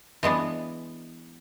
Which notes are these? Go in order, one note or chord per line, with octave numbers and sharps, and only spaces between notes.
E3 G#3 B3 D4